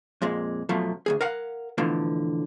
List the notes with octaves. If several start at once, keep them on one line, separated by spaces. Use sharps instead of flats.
F2 A#2 G#3
F#2 B2 F3 F#3 A3
D2 F#3 G#4
A#4 F5 F#5
B2 D3 E3 F3 A3